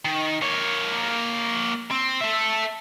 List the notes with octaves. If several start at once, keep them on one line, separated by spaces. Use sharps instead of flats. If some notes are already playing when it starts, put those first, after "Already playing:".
D#3
A#3 C#5
C4
A4 E5